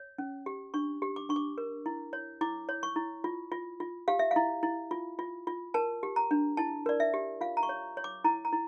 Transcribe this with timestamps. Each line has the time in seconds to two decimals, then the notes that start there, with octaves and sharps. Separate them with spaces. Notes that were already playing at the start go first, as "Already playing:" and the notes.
Already playing: C#5
0.18 C#4
0.46 G4
0.74 D4 C#6
1.02 G4
1.16 D6
1.29 D4 C#6
1.36 D6
1.58 A#4
1.86 E4
2.13 C#5
2.41 E4 D6
2.69 C#5
2.83 C#6
2.96 E4
3.24 F4
3.52 F4
3.80 F4
4.08 G4 F5
4.19 E5
4.31 F5
4.36 E4
4.63 E4
4.91 F4
5.19 F4
5.47 F4
5.74 A#4 A5
6.03 G4
6.16 A#5
6.31 D4
6.57 E4 A5
6.86 A#4 D5
7.00 E5
7.14 G4
7.41 F4 F5
7.57 A#5
7.63 C#6
7.69 C#5
7.97 C#5
8.04 D6
8.24 E4 A#5
8.45 A#5
8.53 E4